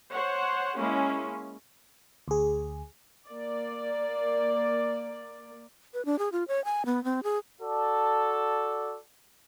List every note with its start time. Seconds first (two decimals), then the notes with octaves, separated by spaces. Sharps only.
0.10 C5 C#5 F#5
0.78 G#3 A#3 C#4 E4
2.28 D2 G#4
3.26 A#3 D5
5.94 B4
6.05 D4
6.19 G#4
6.32 F4
6.48 C#5
6.65 G#5
6.86 B3
7.04 C4
7.23 G#4
7.62 F#4 A4 D5 A5